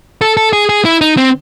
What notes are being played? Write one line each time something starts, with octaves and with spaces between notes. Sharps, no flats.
A4
A4
G#4
G#4
E4
D#4
C4